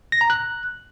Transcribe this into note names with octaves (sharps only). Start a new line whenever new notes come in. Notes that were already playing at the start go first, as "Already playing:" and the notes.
A#6
A#5
F#6